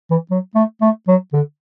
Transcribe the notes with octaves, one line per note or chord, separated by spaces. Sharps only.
E3
F#3
A3
A3
F#3
D3